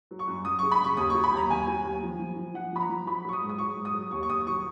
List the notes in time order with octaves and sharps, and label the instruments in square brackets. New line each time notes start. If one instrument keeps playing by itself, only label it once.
[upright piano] F#3
C#6
F#2
F#2 D#6
C#3 C#6
B5
F#2 C#6
D#2 D#6
F#3 C#6
B5
D#2 A#5
D#2 G#5
F#3
D#2
F3
F3
F3
F3 F#5
F3 B5
A#5
F3
F#3 B5
F#3 C#6
D#6
G#2
D#6
F#3 C#6
G#2
D#6
F#3
D#2 C#6
C#6
D#2 D#6
F#3 C#6